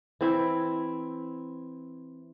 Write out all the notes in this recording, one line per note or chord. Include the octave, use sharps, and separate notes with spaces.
E3 C4 E4